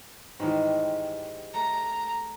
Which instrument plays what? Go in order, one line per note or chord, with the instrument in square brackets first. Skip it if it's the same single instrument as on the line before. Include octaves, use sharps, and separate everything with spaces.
[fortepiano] G#2 D#3 E3 [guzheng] G3 G#3
[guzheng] A3 [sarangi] A#5